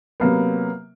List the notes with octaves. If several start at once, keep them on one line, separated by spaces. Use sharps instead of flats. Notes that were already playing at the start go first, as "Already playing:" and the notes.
C3 F#3 A#3 B3